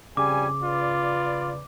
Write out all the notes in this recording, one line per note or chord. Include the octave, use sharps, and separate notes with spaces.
F2 C#3 G3 G#5 D6
F4 B4 D5